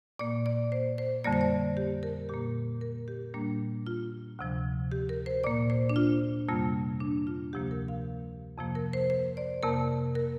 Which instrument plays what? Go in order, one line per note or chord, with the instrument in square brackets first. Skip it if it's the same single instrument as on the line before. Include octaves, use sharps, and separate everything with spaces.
[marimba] A#2 A#3 D5
D5
C5
C5
F2 D3 G3 A#3 D5
C5
D5
G4
A#4
A#2 A#3 G4
A#4
G4
A#2 G3 A#3 D4
F4
D2 C3 F3
G4
A#4
C5
A#2 A#3 D5
C5
D4
F4
F2 C3 G3 A#3 F4
D4
F4
D2 C3 F3 A#3 G4
A#4
F5
F2 C3 F3 A#3
A#4
C5
C5
D5
F2 C3 A#3 A#4
A#4